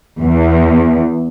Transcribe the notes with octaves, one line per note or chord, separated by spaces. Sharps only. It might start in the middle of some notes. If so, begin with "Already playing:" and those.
E2